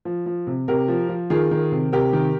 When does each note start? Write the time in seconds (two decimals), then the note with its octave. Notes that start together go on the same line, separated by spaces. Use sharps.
0.05 F3
0.26 F3
0.47 C3
0.68 C3 G4 A#4
0.88 F3
1.09 F3
1.30 D#3 F4 G#4
1.51 D#3
1.72 C3
1.92 C3 G4 A#4
2.13 D#3